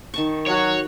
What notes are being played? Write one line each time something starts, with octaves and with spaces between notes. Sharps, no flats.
D#3 A5 C#6
F#3 F#4 C#5